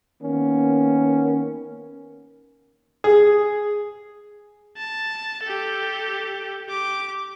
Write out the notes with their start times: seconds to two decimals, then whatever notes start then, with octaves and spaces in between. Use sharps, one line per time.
0.22 D#3 A#3 B3 C#4
3.04 G#4
4.77 A5
5.43 G4 A4
6.66 G4 D6